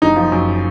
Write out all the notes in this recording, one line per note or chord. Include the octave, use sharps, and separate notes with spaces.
F#1 D#4
F3
F#2